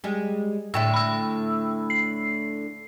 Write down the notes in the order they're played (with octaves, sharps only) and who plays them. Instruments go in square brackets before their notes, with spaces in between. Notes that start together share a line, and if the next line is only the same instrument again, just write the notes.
[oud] G3 G#3
[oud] A2 D3 A3 [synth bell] G5 E6
[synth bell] B5 E6
C7